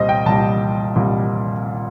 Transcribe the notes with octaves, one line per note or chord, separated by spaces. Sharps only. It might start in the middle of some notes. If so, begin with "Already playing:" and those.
Already playing: C2 A#2 G3 C5 D#5
G5
C2 A#2 G3 A5
C2 A#2 G3